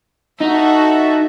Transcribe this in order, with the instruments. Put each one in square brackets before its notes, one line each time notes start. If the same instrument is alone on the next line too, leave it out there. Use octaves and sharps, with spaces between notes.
[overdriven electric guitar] D#4 [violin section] F#4 A4 E5